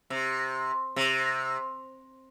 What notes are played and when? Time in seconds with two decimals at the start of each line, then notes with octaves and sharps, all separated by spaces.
0.10 C3
0.96 C3